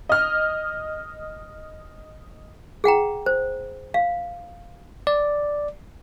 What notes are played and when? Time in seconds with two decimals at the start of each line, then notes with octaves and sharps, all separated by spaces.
0.09 D#5 F6
2.84 G#4 F#5 G5 A#5
3.26 C5
3.94 F5
5.07 D5